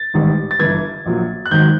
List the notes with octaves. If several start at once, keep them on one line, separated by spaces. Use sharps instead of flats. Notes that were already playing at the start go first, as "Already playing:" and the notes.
Already playing: A6
A1 G#2 D#3 G3
A6
G1 G2 E3 G#6
A#1 A#2 F#3
F#6
G#1 G#2 D#3 F#3 G6